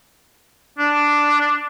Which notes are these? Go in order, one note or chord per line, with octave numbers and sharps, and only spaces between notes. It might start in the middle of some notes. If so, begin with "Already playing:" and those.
D4